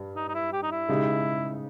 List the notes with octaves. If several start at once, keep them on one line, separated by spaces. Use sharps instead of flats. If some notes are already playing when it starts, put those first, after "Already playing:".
Already playing: G2 G3
D#4
D#4
E4
G4
D#4
E4
C#3 G#3 D#4 G4